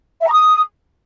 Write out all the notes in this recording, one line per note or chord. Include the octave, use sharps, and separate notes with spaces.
E5
A#5
D#6